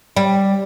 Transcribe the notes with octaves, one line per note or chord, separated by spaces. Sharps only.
G3